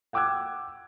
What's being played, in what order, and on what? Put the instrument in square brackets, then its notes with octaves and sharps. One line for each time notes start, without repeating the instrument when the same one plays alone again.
[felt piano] F#5 G5 D6 E6 F#6 G#6